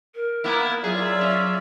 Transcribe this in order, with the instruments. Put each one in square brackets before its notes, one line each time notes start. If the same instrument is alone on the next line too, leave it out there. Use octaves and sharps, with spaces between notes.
[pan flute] A#4
[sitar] A#3 B3 E4
[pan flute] F#3 [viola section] F4 D5 E5 [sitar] G#4
[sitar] C#4